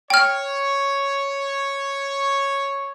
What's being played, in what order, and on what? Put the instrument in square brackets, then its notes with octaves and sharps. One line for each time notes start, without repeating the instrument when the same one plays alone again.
[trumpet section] C#5 [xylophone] G5 F6